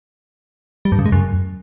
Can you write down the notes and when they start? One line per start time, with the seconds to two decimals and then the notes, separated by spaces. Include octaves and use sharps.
0.85 G3
0.92 G2
0.99 C#3
1.06 G#3
1.12 F#2